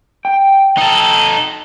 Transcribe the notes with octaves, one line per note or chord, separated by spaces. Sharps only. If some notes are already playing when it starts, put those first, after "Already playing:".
G5
D#4 A4